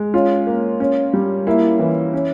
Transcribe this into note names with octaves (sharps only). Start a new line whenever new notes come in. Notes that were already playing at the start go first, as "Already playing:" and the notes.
Already playing: G#3
C#4 F4
A#3
C#4
G3
A#3 E4
E3
C#4